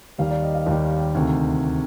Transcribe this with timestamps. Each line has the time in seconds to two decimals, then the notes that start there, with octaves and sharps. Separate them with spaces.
0.18 D#2 D#3 G3 F5
0.31 D5
0.43 D#5
0.55 F5
0.66 D#2 D#3 G3
1.15 D2 C3 D#3